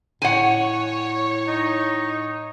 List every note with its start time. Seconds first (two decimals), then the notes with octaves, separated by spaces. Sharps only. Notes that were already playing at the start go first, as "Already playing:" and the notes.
0.22 A2 C#5 F#5 G#5
1.48 D#4